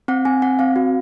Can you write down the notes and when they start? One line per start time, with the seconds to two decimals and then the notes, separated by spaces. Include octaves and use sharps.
0.08 C4 F#5
0.25 C4 G#5
0.42 C4 F#5
0.59 C4 F5
0.76 F#4